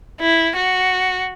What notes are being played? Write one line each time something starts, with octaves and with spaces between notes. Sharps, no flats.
E4
F#4